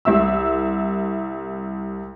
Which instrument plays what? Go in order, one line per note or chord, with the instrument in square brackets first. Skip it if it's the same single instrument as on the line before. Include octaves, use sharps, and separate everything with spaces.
[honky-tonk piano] C2 E5 E6